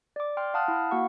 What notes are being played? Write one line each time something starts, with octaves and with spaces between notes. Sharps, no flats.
D5 D6
G5 C6 F6
F5 F#5 A5 D#6 F6 F#6
E4
A#3 F#4 F5 F#5 C#6